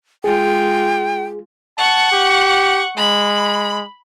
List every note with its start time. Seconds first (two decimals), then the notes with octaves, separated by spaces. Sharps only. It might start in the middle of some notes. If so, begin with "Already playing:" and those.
0.24 G#3 F4 G#4 G5
1.78 F#5 A5 C#6
2.12 G4
2.97 G#3 B5